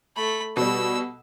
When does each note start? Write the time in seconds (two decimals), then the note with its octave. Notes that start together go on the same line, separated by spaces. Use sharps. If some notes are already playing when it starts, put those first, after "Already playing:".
0.16 A3 B5
0.57 B2 G3 E6